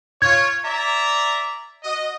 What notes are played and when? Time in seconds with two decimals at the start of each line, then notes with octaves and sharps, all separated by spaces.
0.22 F4 C#5 G#6
0.64 D5 E5 A#5
1.83 F#4 D#5